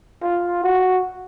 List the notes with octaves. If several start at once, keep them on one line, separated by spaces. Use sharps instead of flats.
F4
F#4